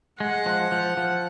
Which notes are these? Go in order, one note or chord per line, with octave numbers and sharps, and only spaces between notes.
G#3 F#5
F3
F3
F3